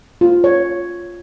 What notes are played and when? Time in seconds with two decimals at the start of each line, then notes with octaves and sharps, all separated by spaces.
0.21 F4
0.44 C#5